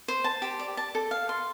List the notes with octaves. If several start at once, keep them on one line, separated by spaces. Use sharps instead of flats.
C5
A5
G4
D5
A5
A4
F5
C6